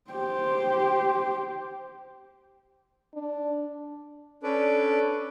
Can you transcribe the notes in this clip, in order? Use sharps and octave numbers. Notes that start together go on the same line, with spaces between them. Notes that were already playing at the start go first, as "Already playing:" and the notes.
G4 C5
D4
C#4 D4 A4 B4 D5